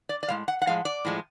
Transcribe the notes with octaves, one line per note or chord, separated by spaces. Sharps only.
D5
D5
A2 F3 G#3 F5
F#5
F#5
A2 F3 G#3 F5
D5
A2 F3 G#3